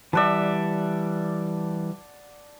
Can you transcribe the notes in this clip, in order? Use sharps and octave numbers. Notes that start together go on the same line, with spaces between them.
E3 G3 D5 E5 F#5 A5